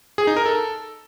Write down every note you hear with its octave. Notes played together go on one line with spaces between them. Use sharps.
G#4
D#4
A#4
A4